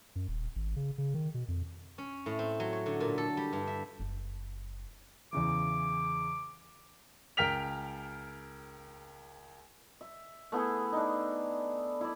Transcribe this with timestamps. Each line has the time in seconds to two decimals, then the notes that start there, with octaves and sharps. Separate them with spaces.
0.16 F#2
0.28 D#1
0.56 G#1
0.76 C#3
0.98 C#3
1.14 D#3
1.34 B2
1.48 F2
1.98 C#4
2.26 A2
2.39 C4
2.60 F#3
2.73 C#5
2.86 D3
3.00 A#2
3.18 A4
3.37 G3
3.53 G2
3.67 E5
3.99 F#1
5.33 E2 C#3 E3 D6
7.37 C#2 A#4 G5 F6 B6 F7
10.01 E5
10.52 A3 B3 E4 G#4
10.93 D4 D#4
12.01 E4 D5